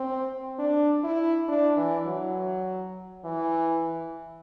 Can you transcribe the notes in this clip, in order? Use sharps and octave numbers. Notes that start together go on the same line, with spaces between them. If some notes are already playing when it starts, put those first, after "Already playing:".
Already playing: C4
D4
E4
D4
E3
F#3
E3